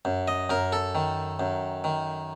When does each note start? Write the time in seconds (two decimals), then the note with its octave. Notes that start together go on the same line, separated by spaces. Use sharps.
0.05 F#2
0.28 D#5
0.50 F#2 A#4
0.72 A4
0.95 D#3
1.40 F#2
1.84 D#3